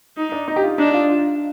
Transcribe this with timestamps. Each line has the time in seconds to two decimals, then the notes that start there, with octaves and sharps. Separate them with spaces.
0.17 D#4
0.32 D4
0.48 D#4
0.56 G4
0.63 F4
0.78 D4 D#4
0.94 F4
1.09 F4